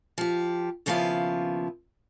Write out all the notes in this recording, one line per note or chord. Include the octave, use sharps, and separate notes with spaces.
F3 G4
D#2 C#3 F3 B3 E4 F5